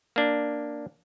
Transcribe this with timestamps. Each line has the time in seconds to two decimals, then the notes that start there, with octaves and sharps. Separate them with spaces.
0.16 A#3 D4